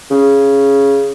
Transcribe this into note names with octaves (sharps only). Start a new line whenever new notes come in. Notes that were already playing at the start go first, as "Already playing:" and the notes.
C#3